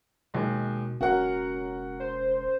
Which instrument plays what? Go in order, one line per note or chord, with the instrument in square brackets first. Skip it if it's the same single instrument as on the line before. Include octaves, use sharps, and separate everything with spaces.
[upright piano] D#2 G#3 [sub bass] B2
[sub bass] E1 [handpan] C#4 A#4 [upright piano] F#4 F#5
[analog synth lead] C5